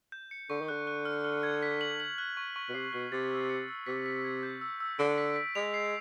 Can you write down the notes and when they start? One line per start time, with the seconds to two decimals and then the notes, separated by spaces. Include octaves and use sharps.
0.12 G6
0.31 C#7
0.50 D3 C#6
0.61 D#3
0.68 D3 F#6
0.87 F#6
1.05 F6
1.24 F6
1.43 G#6
1.63 B6
1.81 F#7
2.00 F#7
2.18 F#6
2.37 C#6
2.56 C#6
2.69 B2
2.74 C3 C7
2.93 B2 F#6
3.12 C3 A6
3.31 E6
3.49 C#7
3.68 E6
3.87 C3 B6
4.06 B6
4.25 G#6
4.43 G6
4.61 E6
4.80 E6
4.99 D3 D7
5.18 B6
5.36 B6
5.55 G#3 F7
5.74 C7